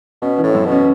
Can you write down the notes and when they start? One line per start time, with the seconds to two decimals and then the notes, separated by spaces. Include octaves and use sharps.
0.22 B2 C#4
0.38 E3
0.44 A2
0.55 F#2
0.66 B2
0.72 C#4